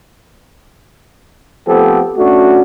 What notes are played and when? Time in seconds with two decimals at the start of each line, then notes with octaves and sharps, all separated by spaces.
1.67 F3 A3 B3 C4 G4 A4
2.17 A3 C#4 D4 F#4